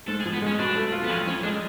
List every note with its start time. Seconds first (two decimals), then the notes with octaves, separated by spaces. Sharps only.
0.08 G#2 A4
0.21 G#4
0.25 F3
0.33 B3
0.42 G#3 C#4
0.59 B2 D4
0.76 A3
0.92 F4
1.04 B3
1.10 F2 C#4
1.27 F3 C#4
1.43 G#3 D4